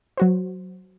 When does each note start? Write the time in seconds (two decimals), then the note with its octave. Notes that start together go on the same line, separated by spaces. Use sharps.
0.17 F#3 F#4 C5